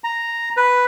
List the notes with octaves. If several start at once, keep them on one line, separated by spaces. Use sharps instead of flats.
A#5
B4